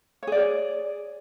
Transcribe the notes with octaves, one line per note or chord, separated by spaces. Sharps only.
G#4 C#5 D5